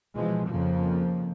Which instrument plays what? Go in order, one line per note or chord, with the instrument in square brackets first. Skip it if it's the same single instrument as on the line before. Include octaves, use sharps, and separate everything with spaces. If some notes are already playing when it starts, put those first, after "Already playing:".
[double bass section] B2 E3 F3 G#3
F2 C#3 F3 A#3